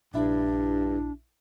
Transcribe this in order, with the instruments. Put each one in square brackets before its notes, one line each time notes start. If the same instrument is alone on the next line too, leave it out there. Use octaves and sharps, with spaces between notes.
[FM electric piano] A#1 E4 [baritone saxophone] G2 [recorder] D4